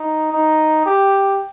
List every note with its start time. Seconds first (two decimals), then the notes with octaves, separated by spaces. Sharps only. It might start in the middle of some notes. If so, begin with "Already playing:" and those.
Already playing: D#4
0.32 D#4
0.86 G4